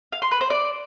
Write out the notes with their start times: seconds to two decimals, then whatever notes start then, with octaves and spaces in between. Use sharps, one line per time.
0.13 F5
0.22 C6
0.31 B4
0.41 C5
0.50 D5